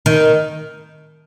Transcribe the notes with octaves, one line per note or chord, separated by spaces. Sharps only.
D#3